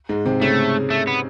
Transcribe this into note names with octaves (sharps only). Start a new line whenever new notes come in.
G#2 G#3
C3 C4
C#3 A3 C#4
A3
B3